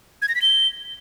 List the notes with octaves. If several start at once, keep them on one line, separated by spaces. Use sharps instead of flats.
G#6
A#6
B6
G7